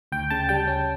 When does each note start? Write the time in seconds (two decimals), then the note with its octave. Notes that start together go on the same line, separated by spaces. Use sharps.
0.12 D2 G5
0.30 C#3 A5
0.49 G3 G5
0.67 C#4